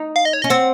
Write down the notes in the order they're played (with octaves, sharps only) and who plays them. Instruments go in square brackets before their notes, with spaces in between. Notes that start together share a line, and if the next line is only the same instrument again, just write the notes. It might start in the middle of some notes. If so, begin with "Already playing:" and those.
Already playing: [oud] D#4
[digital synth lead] F5
D#5
C#5
[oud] C#4 [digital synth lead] D#5
[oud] C4 [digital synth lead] F#5